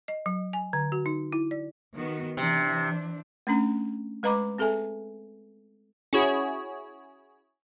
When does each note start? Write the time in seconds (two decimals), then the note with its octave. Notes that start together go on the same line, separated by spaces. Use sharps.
0.08 D#5
0.26 F#3
0.53 G#5
0.73 D3
0.92 F#4
1.06 D#4
1.32 E4
1.51 D5
1.95 D#3 B3 F#4
2.37 C3 E3 D4
3.47 A3 C#4 D4 A#5
4.23 G#3 B4 D#5 A#5 B5 D6
4.58 C4 G#4 A4 E5 G#5
6.13 C#4 E4 F#4 G#4 C#5